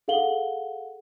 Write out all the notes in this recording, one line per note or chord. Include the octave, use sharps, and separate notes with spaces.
G#4 A4 F5 F#5 F#7 G7